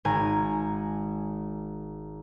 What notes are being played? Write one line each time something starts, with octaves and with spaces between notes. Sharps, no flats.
G#1 G#5 A#5